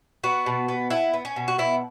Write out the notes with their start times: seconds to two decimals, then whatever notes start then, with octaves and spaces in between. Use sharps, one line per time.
0.24 B3 F#4
0.46 B2
0.68 B3
0.90 B3 E4
1.14 B3
1.25 C#4
1.36 B2
1.48 F#4
1.58 B3 E4